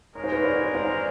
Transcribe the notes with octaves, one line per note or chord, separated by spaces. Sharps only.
G#3 C#4 F4 A#4 C#5
C5
B4 C#5
C5 D5
C5 D5